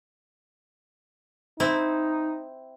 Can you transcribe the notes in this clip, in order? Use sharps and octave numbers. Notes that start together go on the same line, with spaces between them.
C4 D#4 E4